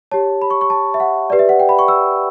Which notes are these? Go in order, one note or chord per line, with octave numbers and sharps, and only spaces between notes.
G4 C#5 A5
B5
C#6
C#6
A5
E5
F#5
G4 B4 D5
E5
F#5
G5
B5
C#6
E6